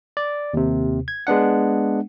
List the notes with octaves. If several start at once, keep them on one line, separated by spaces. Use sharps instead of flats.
D5
D#2 C3
G#6
G#3 B3 D4 F#5